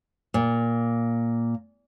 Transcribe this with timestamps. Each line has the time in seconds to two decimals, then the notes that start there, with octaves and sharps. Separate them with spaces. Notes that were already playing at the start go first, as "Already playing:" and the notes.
0.34 A#2